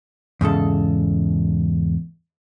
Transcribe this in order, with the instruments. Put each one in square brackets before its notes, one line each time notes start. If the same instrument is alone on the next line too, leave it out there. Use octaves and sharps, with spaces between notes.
[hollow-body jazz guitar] E2 G#2 C#3 A4